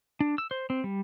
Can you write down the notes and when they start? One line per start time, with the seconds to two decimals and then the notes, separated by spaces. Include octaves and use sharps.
0.20 D4
0.38 E6
0.51 C5
0.70 C4
0.84 G3